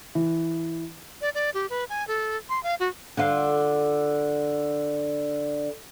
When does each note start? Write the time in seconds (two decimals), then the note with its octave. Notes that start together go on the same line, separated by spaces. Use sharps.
0.15 E3
1.21 D5
1.35 D5
1.54 G4
1.70 B4
1.89 G#5
2.08 A4
2.49 C6
2.63 F5
2.80 F#4
3.17 D3 F4